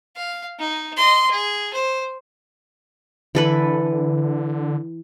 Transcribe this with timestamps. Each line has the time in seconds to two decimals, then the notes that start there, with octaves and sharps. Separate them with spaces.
0.16 F5
0.59 D#4
0.96 D#5 C6
1.31 G#4
1.73 C5
3.35 D3 E3 A4 B4